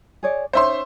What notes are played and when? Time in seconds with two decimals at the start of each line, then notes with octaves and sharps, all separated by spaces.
0.23 G#4 C#5 D5
0.53 C#4 D#4 C5 C#5 E5 C6